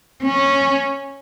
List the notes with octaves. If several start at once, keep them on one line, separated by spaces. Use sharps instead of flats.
C#4